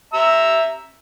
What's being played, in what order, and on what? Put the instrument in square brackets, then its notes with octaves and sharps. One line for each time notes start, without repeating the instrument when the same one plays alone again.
[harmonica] E5 A#5 E6